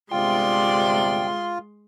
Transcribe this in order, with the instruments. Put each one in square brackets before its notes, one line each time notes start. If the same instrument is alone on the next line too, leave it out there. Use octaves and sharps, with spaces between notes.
[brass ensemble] G1 C3 D5 [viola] G#3 C6 [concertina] F4 [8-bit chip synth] G5